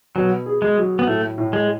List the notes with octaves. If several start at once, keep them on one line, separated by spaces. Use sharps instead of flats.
B2 F#3
G#4
G#3
F#3
B3
A2 A3
A2
G#3